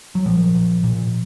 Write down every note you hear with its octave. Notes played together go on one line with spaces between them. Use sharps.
F#3
A#2 F3
A#2
A#2